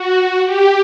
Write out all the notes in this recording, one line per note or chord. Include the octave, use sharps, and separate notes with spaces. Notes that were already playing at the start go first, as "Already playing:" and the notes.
Already playing: F#4
G4